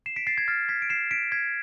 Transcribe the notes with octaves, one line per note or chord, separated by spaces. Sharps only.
C7 E7
B6 D7
A6 C7
G#6 B6
F6 A6
G#6 B6
D7
C7 E7
B6 D7
G#6 B6